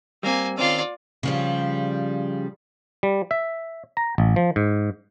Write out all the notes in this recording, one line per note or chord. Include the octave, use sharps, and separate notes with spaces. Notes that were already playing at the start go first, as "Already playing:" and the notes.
G3 A#3 C4 G#5
D#3 C4 C#4 F4 D5
C#3 F3 G3
G3
E5
A#5
A1
F3
G#2